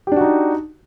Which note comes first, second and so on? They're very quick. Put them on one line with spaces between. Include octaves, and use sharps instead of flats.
G4 D4 F#4 D#4